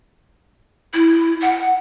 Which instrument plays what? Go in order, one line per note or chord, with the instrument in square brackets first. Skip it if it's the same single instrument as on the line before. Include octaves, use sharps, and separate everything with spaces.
[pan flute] E4
F#5